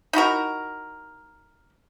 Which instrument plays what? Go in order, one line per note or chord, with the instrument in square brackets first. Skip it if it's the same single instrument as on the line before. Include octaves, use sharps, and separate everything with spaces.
[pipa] D#4 E4 F#4 A#4